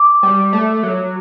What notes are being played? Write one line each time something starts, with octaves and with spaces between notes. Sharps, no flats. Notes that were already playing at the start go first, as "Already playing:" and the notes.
Already playing: D6
G3
A3
F#3